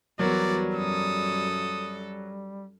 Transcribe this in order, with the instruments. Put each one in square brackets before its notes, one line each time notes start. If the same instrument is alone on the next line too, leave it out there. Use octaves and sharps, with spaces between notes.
[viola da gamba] E2 F#4 [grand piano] F#3 A#4 [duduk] G3 [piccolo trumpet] D5
[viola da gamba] F#2 A4 [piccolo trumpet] D#6
[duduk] G3